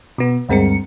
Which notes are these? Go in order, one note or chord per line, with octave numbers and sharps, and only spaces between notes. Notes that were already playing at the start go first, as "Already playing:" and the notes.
B2 B3
D2 G2 G#3 C4 A#4 C#7